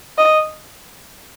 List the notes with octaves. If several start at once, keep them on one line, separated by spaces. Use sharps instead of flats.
D#5